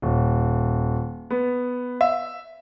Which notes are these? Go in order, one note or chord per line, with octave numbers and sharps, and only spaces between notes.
D#1
B3
E5